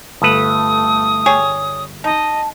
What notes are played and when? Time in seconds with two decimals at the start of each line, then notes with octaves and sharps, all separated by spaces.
0.22 G1 A3 A4 B4 D#6
1.26 G3 G#4 C#5
2.04 D#4 D#5 A5